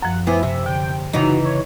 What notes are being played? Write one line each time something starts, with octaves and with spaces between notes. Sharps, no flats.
F#2 F3 F#5
B3 E4 C5 G#5 D6
C3 E5
D3 G5
C#3 E3 F#3 D#4 A#5
C#5